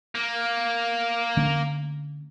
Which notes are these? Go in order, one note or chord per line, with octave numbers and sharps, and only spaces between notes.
A#3
D3 A3 C#4